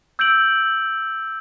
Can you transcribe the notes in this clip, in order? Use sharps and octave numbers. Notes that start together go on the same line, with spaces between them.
E6 G6 D7 F#7